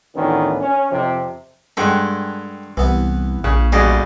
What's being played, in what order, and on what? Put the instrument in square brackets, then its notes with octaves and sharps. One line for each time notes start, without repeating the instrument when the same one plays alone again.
[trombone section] D2 A2 D#3 E3 B3 C#4
C#4
F2 C3 F3
[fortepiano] G2 G#3 [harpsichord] A4 F#5 G5
[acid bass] C2 [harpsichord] E3 B3
[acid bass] A#1 [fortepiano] C#3
[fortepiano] A1 B2 G3 [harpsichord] G#4 D#5